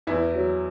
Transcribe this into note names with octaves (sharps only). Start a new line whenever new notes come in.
E2 E4
F#3